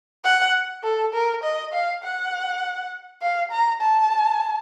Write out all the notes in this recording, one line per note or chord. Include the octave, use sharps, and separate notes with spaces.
F#5
A4
A#4
D#5
F5
F#5
F5
A#5
A5